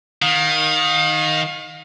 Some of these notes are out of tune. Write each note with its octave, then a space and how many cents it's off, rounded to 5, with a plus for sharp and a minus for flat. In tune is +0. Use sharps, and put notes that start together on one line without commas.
D#3 +0 F5 +35